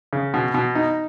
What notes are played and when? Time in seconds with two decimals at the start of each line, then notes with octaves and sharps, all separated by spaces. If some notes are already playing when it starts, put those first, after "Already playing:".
0.13 C#3
0.34 B2
0.54 B2
0.75 D#4